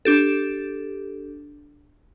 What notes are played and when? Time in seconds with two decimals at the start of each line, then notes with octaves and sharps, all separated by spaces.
0.05 D4 G4 A4